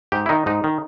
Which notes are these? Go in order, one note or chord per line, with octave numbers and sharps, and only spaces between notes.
G#2 G4
E4
D#3 D#4
G#2 D#4
D#3